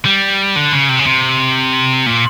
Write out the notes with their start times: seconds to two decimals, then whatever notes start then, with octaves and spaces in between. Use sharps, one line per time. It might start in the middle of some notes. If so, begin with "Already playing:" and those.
0.05 G3
0.56 D3
0.73 C#3
0.89 C3
0.99 C#3
1.06 C3
2.06 A#2